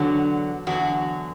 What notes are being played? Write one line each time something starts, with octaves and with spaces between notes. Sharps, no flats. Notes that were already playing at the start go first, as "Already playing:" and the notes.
Already playing: E2 D3 F#3
E2 D3 F#3 F#4